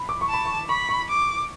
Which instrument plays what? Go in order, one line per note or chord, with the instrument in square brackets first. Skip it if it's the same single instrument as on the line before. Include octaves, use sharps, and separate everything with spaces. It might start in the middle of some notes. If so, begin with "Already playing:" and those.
Already playing: [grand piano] B5
D6
C#6
[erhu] A5 [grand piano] B5
[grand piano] C#6
[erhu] B5 [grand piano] C#6
[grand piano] C#6
[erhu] D6